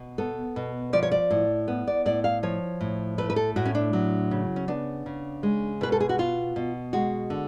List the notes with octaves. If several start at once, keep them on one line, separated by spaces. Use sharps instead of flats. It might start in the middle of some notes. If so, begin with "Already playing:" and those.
Already playing: B2
B3 A4
B2
F3 D5
C#5
D5
A2
B3
D5
A2 D5
F5
F3 C#5
A2
A3 B4
B4
A4
A2 F#4
C#4
D4
F#3
C#3
C#4
B3 D4
C#3
G#3
B2 B4
A4
G#4
F#4
B3 F4
B2
G#3 F#4
D3